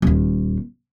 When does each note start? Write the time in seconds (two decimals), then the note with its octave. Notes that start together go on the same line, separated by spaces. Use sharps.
0.02 D#1 D#2